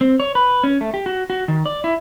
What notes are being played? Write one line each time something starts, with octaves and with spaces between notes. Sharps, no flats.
C4
C#5
B4
C#4
A3
G4
F#4
F#4
D#3
D5
E4